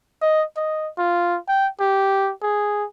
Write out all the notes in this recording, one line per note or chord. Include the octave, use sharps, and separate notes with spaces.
D#5
D#5
F4
G5
G4
G#4